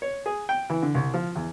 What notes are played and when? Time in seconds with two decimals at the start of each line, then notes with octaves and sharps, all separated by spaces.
0.02 C#5
0.26 G#4
0.49 G5
0.70 E3
0.82 D3
0.95 C2
1.14 F3
1.36 E2